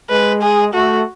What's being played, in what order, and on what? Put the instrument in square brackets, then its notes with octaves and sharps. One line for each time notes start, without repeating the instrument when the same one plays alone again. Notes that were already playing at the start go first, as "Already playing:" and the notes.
[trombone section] G#3 [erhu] B4
[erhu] G#4
[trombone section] A3 [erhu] F#4